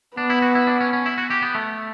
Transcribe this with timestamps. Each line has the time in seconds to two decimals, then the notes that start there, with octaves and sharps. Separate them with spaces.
0.17 B3 D4
0.30 E4
0.42 F#4
0.55 E4
0.67 D4
0.81 C#4
0.93 C#4
1.06 E4
1.18 F#4
1.30 G4
1.42 B3
1.55 A3